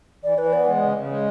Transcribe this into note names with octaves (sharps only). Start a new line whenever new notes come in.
E3 D5
E3 B4
B3 D5
G#3
C#3
C#3
G#3